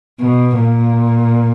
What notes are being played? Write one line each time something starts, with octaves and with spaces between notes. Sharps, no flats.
B2
A#2